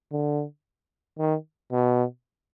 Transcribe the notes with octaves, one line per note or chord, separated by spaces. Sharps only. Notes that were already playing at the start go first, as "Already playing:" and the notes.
D3
D#3
B2